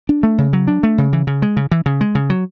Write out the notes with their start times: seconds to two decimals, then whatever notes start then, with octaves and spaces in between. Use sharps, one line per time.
0.09 D4
0.23 A3
0.38 C#3
0.53 F#3
0.67 D4
0.83 A3
0.98 C#3
1.13 E3
1.27 C#3
1.42 G#3
1.57 C#3
1.71 E3
1.86 C#3
2.01 G#3
2.15 C#3
2.30 F#3